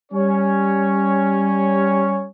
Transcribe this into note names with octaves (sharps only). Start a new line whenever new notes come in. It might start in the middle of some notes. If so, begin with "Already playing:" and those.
G3 C#4 C#5